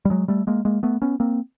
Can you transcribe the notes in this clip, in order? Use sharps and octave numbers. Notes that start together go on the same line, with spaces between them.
G3
F#3 G#3
G3 A3
G#3 A#3
G#3 A#3
A3 B3
B3 C#4
A#3 C4